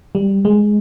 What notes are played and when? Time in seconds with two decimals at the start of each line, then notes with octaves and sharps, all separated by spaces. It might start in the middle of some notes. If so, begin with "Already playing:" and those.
0.15 G3
0.45 G#3